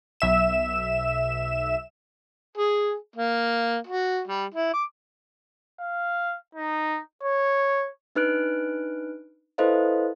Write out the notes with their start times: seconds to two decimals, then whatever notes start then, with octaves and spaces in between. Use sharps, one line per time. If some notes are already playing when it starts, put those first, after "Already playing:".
0.20 B1 E5 E7
2.58 G#4
3.16 A#3
3.87 F#4
4.28 G3
4.55 E4
4.73 D6
5.80 F5
6.55 D#4
7.23 C#5
8.15 D4 D#4 B4 F6 F#6 D7
9.58 E4 A4 B4 C5 D#5 F5